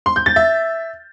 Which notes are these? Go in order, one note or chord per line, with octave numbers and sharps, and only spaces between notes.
C6
G6
A6
E5